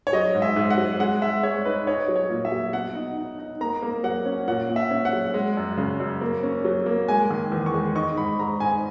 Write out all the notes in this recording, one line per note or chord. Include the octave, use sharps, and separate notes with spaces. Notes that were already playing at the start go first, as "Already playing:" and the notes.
C#5
F#3 D#5
G#2
E5
G#2
F#5
F#3
G#3 F#5
G#3 E5
G#3 C#5
D#4 B4
D#4 C#5
F#3
C#5
A#2
E5
F#3
B2 F#5
D#4
D#4
D#4
A#3 A#5
A#3
F#3 F#5
C#4
A#2 F#5
A#2
E5
C#4
F#5
F#3
G#3
F#2
C#3
F#2
A#3
C#4
F#3
A#3
G#3 G#5
D#3
E2
C#6
G#3
D#4 C#6
G#2 B5
G#2 A#5
G#2 G#5